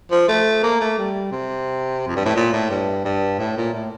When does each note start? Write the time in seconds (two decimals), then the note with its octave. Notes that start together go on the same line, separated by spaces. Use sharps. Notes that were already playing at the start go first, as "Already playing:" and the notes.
0.11 F3
0.28 A3
0.63 A#3
0.80 A3
0.98 G3
1.32 C3
2.07 F2
2.16 G2
2.25 A2
2.35 A#2
2.53 A2
2.70 G2
3.05 G2
3.39 A2
3.57 A#2
3.73 A2